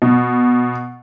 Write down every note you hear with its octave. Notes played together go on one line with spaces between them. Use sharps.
B2